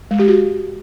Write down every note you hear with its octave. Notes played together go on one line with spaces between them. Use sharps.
G#3
G4
F#4